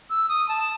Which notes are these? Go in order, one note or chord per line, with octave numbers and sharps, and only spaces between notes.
E6
D#6
A5